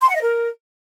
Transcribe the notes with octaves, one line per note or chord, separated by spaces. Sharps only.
C6
F#5
D#5
A#4